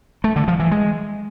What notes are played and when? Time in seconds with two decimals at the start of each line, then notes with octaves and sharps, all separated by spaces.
0.24 A3
0.36 D3
0.48 F3
0.60 E3
0.71 G#3